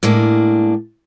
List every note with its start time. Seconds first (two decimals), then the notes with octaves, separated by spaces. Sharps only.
0.03 A2 G#3 A#3 D4